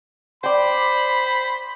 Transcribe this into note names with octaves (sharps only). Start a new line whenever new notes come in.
C5 D5 G5 B5